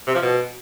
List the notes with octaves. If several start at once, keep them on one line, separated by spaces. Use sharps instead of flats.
C3
F3
B2